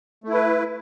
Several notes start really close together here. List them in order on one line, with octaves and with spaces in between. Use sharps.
A3 E4 B4